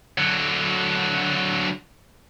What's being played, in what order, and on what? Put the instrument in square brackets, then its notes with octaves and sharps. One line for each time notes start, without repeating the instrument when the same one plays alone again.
[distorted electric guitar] D3 F#3